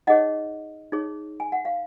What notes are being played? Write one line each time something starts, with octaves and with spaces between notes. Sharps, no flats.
D#4 G#4 C#5 D#5 F#5
D#4 G#4 C#5
G#5
F#5
F5